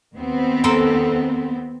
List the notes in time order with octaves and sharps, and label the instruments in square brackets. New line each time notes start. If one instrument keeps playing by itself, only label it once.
[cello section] D#2 B3 C4
[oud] A4 A#4 C5